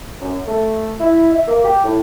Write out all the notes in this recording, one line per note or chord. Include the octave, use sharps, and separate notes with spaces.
F#2
A3
E4
E5
A#3
G4
A2